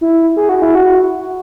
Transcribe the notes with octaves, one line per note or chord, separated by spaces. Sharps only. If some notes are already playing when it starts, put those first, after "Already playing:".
E4
G#4
F#4
E4
F#4